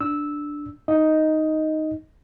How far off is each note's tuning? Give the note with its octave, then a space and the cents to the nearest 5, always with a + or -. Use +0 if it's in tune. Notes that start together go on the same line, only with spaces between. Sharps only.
D4 +0 E6 -10
D#4 +0 D#5 +5